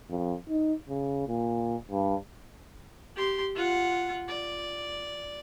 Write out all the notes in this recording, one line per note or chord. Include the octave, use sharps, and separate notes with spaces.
F2
D#4
C#3
A#2
G2
G4 C6
F4 F#5
D5